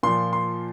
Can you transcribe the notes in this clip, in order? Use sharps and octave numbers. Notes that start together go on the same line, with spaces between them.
A#2 F3 C6
C6